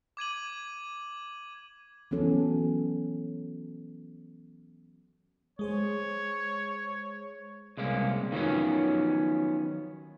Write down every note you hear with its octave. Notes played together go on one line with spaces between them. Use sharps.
D6 G#6 D#7 F#7
E3 F#3 B3 C#4 A4
G#3 G#4 C5 C#5
C2 G#3 A#3 C#4
D#3 F3 F#3 B3 C#4